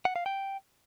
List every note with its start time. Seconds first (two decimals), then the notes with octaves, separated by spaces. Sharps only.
0.05 F#5
0.16 F5
0.26 G5